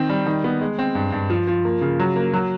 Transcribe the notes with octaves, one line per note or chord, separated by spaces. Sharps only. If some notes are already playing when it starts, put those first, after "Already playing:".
Already playing: D#3 C4
G3
D#3
B3
G#3
C4
G2
G2
F3
F3
A#3
C#3
F#3
A#3
F#3